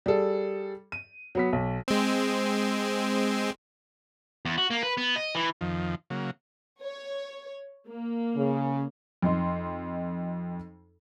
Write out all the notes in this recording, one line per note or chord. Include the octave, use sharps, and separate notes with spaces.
G3 G#4 A4
D#7
F#3 B3 B6
B1
G#3 C4
E2
F#4
A#3
B4
B3
D#5
E3
F2 D#3 F3
C#3 F#3 A#3
C#5
A#3
C#3
F2 D#4 C6